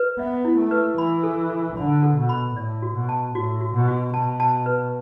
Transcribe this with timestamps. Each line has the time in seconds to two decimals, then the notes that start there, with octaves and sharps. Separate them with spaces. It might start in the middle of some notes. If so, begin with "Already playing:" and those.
Already playing: B4
0.19 B3 E5
0.45 E4
0.58 A3
0.71 B4
0.98 E3 B5
1.23 A4
1.50 A4
1.76 D3 B5
2.03 A4
2.17 B2
2.29 B5
2.56 A2 D5
2.82 F#4
2.95 B2
3.09 A5
3.35 A2 F#4
3.61 F#4
3.74 B2
3.88 F#4
4.14 B2 A5
4.40 A5
4.66 B4